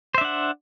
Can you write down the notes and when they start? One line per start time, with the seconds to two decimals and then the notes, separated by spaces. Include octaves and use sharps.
0.14 C5
0.18 E5
0.21 D4
0.25 F#5